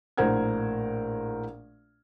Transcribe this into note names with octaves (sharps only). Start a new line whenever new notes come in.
A#1 A2 A#4 C5 F#5 G#6